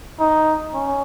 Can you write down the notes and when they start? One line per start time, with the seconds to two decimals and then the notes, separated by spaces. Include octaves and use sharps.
0.20 D#4
0.74 C#4